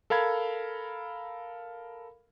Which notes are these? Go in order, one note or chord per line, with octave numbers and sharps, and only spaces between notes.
A4 A#4 F5 B5 G#6